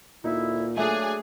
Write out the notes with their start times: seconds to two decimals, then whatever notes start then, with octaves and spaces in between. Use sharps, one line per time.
0.24 D2 A#2 D#4 E4 E5
0.77 F#3 A3 A#3 D4 G#4 E5 G#5